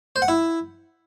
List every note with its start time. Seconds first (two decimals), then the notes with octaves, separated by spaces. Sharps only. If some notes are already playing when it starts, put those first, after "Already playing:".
0.16 C5
0.22 F#5
0.28 E4